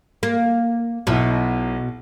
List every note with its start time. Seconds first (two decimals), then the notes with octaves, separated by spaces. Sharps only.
0.23 A#3
1.07 B1 B2 E4